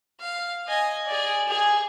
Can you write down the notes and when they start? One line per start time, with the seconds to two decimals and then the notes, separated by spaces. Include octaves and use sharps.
0.20 F5
0.67 D#5 G#5
1.07 G#4 D5
1.48 G#4 G#5